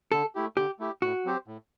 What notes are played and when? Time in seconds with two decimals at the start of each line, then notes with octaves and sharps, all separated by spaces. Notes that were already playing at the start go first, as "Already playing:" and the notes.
0.12 D3 A4
0.35 A3 E4 G4
0.57 D3 G4
0.79 A3 E4 G4
1.02 A2 F#4
1.25 F#3 C4 G4 C5
1.47 A2